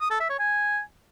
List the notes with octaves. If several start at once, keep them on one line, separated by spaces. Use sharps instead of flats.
D#6
A4
E5
C#5
G#5